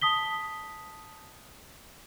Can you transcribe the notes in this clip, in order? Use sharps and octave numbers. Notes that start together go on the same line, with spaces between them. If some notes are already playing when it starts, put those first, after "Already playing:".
A5 D#6 B6 G7